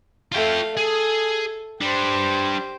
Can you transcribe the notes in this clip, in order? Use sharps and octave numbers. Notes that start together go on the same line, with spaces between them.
A3 F4 F5 G5
G#4 A4
G3 D4 G4 C5